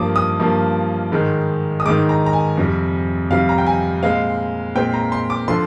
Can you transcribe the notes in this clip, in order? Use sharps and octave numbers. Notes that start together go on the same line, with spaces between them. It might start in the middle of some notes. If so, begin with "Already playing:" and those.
Already playing: G2 F3 A#3 D6 D#6
D#6
G2 F3 A#3
G#2 D#3 G#3
D#6
G#2 D#3 G#3 D6
A#5
A#5
G#5
F2 C3 G3
F2 C3 G3 F5
A#5
G5
G#5
A#2 G#3 C4 F5
A#2 G#3 C4 G5
A#5
C6
D6
D3 F3 C6